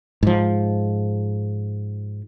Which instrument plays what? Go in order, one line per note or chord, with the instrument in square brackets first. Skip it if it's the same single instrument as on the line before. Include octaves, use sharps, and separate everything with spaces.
[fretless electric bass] G#2 F3